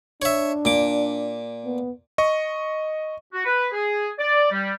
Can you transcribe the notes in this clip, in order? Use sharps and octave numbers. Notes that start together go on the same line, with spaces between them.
D4 C#5 E5
A#2 D6
B3
D#5 C#6
F#4
B4
G#4
D5
G3